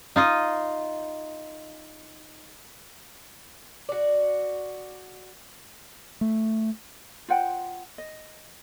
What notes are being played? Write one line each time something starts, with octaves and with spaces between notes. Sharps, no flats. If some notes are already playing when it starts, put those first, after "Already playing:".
D#4 F4 D#5
F#4 D5
A3
F4 C5 F#5 G5
D#5